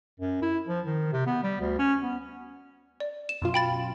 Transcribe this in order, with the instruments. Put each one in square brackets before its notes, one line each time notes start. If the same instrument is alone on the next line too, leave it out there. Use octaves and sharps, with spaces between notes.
[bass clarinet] F#2
E4
F3
D#3
C3
B3
G3
D2
C#4
B3
[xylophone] D5
E7
[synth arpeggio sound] F#2 B2 F4
[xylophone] G5 B5 A6